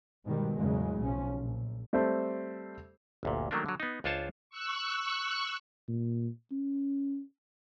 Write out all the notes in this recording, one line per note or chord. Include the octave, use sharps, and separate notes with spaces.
G#2 B2 D#3 G3
E2 A2 C#3 F#3 G#3
B1 F3 C#4
A#1
G3 A3 C4 C5
G1 D2 A#2
D#3 F#3 A3 A#3 C#4 D4
D3 F#3
B3 D#4
C#2 D4 F4 C5 C#5 A5
C#6 E6 F#6
A#2
C#4